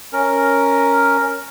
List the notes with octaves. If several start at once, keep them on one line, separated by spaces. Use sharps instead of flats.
C#4 A#4